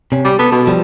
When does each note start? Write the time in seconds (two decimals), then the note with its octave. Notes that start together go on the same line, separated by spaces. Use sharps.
0.12 C3 C#4
0.25 G3
0.39 B3 A4
0.51 B2
0.67 F3 G3